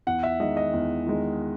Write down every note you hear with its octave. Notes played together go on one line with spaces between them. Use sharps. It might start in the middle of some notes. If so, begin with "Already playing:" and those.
E2 F#5
E5
D#3 G#3 D#5
D#5
E2
D#3 G#3